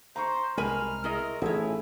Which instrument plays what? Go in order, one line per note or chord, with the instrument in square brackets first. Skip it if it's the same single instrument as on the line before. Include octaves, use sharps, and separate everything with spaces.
[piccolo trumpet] C5 [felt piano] A#5 C6 C#6
[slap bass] C2 G#3 [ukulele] A#4 G#5 B5 [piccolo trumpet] F6
[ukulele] E4 G#4 D#5 [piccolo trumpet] A#4
[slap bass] A1 [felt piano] A3 G#4 [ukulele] D#4 C#5 [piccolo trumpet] E4